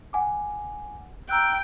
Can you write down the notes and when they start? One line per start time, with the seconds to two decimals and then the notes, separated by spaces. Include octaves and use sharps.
0.13 F#5 G#5 D6
1.30 G5 A#5 E6 F#6